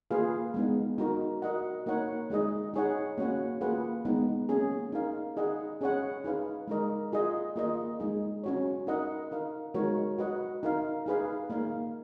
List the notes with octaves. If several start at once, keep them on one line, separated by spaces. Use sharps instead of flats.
A#3 F4 G#4 B4 F5
G#3 B3 D#4
D#4 F#4 A#4
F#4 A#4 D#5 F#5
A#3 D#4 A#4 C#5 F#5
G#3 D#4 G#4 D#5
D#4 G#4 C#5 F#5
A#3 C#4 F#4 C#5 F#5
A#3 F4 G#4 B4 F#5
G#3 B3 D#4
A#3 C#4 G#4
D#4 A#4 F5
D#4 G#4 D#5 F#5
C#4 G#4 C#5 F#5
D#4 G#4 B4 F5
G#3 D#4 A#4 D#5
F4 G#4 D#5 F#5
A#3 F4 A#4 D#5
G#3 D#4 G#4
C#4 F#4 C#5
D#4 A#4 D#5 F#5
D#4 A#4 F5
G#3 D#4 F#4 A#4 C#5
F#4 B4 D#5 F#5
D#4 A#4 F5
D#4 G#4 B4 F5
A#3 D#4 A#4 F5